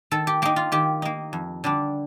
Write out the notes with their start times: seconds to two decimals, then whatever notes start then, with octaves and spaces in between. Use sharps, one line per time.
0.11 D#3 A4
0.27 G4
0.42 A#3 D#4 G4
0.56 F4
0.72 D#3 G4
1.02 A#3 D#4
1.33 F2
1.64 D3 G3 D4